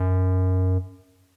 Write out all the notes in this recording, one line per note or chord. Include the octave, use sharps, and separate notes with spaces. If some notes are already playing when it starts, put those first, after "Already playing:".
Already playing: F#2